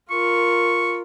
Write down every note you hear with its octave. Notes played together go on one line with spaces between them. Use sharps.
F4 A#4 C#6